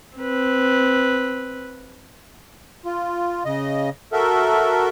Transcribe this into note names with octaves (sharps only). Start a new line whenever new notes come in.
C4 B4
F4
C#3 D#5
F#4 A4 A#4 E5